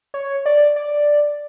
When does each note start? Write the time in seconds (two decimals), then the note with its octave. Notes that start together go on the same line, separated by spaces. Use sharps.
0.14 C#5
0.46 D5
0.76 D5